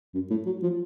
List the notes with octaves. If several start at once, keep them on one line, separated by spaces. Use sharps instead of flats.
F#2
A2
F#3
F3